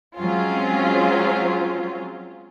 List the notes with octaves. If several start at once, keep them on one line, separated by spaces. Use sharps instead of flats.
F#3 G#3 C4 C#4 F4